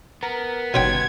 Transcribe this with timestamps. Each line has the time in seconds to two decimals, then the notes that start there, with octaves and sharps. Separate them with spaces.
0.23 B3 A#4
0.74 G1 B2 D#3 C#4 G5 C6 G#6